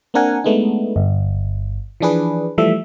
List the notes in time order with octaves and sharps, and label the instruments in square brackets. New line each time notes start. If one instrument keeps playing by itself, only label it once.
[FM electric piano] A#3 C4 D4 A#4 F#5 G#5
G#3 A3 B3 D4 D#4
G1
E3 F3 D4 G#4 B4
E3 F3 G3 A3 E5